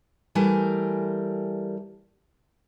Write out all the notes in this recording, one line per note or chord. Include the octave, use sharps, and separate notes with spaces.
E3 G3 A3 A#4 G#5